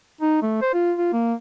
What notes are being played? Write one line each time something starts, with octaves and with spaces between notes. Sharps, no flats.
D#4
A3
C5
F4
F4
A#3